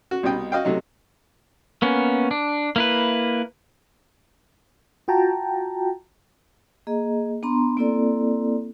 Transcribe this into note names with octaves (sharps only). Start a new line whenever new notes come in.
F#4
C2 B2 D#4 D#5 G5
F#4 D#5 F5 G5
C3 F#3 A3 D#4
A#3 B3 C#4
D4
A#3 E4 B4
F4 F#4 G5 A5 A#5
A#3 G#4 D#5 A#5
B3 D4 A#5 C6
A#3 C4 E4 A4 D5